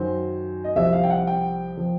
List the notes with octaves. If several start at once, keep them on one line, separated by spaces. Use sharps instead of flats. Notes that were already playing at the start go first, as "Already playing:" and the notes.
Already playing: F#2 D#3 F#3 C5
D#5
C2 C3 F3 E5
F5
G5
F#5
G5
F3